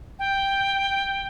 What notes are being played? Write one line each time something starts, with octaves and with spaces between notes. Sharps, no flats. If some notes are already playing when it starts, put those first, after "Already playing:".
G5